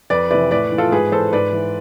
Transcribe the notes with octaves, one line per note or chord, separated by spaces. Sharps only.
F2 B4 D5
C3 E3 B4 D5
A2 B4 D5
E3
F4 A4
G#2 G#4 B4
E3 A4 C5
G#2 B4 D5
E3